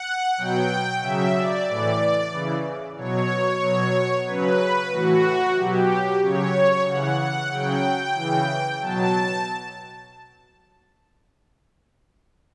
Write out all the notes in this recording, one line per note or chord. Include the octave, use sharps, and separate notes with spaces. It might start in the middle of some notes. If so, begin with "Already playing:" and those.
Already playing: F#5
B2 F#3 G5
C#3 F#3 E5
D5
A2 E3 D5
C#3 E3
B2 F#3 C#5
B2 F#3
C#3 F#3 B4
A2 E3 F#4
B2 F#3 G4
C#3 F#3 C#5
C#3 E3 F#5
F#5
C#3 F#3 G5
C#3 E3
B2 F#3 A5